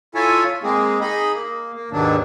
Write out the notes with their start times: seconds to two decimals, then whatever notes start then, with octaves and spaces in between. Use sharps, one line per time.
0.15 E4 F4 A4 C#5 E5 G#5
0.63 G#3 A#3 C4 G#4
1.01 D#4 G#4 D#5 B5
1.33 A#3
1.74 A#3
1.91 D#2 G#2 B2 D#3 F#3 D4